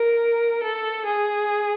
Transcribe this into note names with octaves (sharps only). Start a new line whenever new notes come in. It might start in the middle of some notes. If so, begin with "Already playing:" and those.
Already playing: A#4
A4
G#4